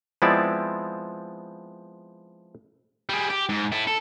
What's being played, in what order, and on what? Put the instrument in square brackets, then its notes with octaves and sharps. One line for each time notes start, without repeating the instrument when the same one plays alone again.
[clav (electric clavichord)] F3 G#3 B3 C4 E4 D5
[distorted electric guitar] G3 G#4
G4
G#2
E4 A4
A4